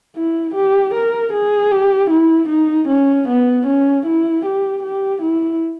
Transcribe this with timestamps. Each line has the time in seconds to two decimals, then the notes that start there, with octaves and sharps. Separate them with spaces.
0.16 E4
0.55 G4
0.94 A#4
1.33 G#4
1.71 G4
2.10 E4
2.49 D#4
2.88 C#4
3.28 B3
3.67 C#4
4.06 E4
4.45 G4
4.83 G4
5.22 E4